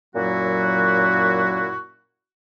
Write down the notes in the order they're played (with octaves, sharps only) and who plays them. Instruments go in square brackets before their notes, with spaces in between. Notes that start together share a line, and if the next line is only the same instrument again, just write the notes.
[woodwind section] F#2 A#2 F#3 E4 F#4